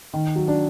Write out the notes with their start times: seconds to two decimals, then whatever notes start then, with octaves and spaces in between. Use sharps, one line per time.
0.13 D#3
0.36 F#3
0.48 D4